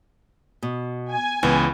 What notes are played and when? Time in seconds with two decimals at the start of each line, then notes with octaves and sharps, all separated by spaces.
0.63 B2
1.12 G#5
1.43 C#2 E3 B3